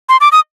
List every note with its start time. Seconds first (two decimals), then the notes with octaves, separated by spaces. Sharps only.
0.09 C6
0.21 D6
0.32 D#6